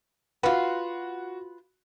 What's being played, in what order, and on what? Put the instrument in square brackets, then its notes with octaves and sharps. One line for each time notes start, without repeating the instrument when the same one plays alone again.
[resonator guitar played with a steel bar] F4 B4 [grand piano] F#4